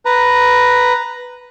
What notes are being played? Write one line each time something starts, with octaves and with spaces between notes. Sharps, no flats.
B4 A#5